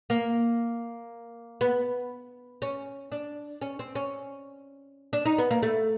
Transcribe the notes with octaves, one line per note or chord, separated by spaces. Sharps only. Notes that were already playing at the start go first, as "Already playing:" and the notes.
A#3
B3
C#4
D4
C#4
C4
C#4
D4
D#4
B3
A#3
A3